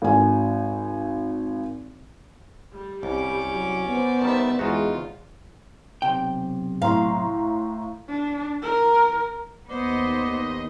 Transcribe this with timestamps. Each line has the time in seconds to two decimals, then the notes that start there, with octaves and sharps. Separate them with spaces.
0.02 G#1 G#5
2.71 G3
3.03 C2 C#4 D6
3.52 F#3
3.87 B3 C5 D5
4.21 D#3 G3 E5 A5
4.59 E2 G#3 D#4 F4 F#4
6.02 B1 C3 G5
6.82 A2 F5 A#5 C6
8.08 D4
8.62 A#4
9.70 D#2 B3 C5 D5 D#5